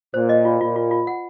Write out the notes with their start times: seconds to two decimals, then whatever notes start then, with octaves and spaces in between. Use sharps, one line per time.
0.14 A#2 C5
0.29 D#5
0.45 F4
0.60 A#2 F4
0.76 F4
0.91 F4
1.07 F#5